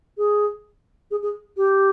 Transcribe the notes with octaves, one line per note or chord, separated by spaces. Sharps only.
G#4
G#4
G#4
G4